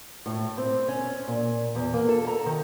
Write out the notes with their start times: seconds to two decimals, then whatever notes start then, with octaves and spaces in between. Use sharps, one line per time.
0.26 A2
0.57 C4
0.88 C#4
1.27 A#2
1.75 E2
1.94 A#3
2.09 A4
2.27 A#5
2.46 D#3